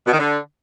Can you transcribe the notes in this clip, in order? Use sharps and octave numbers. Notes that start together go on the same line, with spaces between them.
B2
D#3
D3